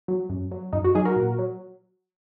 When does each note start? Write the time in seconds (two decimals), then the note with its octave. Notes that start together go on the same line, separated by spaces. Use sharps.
0.08 F#3
0.29 F#2
0.51 F#3
0.73 F#2 D#4
0.84 F#4
0.95 F#3 D#4 G#4
1.05 F#4 A#4
1.16 A#2
1.39 F#3